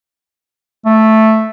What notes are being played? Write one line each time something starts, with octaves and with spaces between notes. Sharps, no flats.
A3